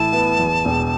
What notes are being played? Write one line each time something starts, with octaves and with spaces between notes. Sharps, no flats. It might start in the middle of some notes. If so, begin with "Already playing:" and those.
Already playing: A2 E3 E4 A5
B3
E2
E1